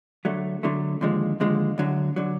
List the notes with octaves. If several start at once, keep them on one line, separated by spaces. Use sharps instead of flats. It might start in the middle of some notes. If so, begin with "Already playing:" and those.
D3 F#3 A3
D3 F#3 A3
D#2 D3 F3 G#3
D#2 D3 F3 G#3
D2 D3 F#3
D3 F#3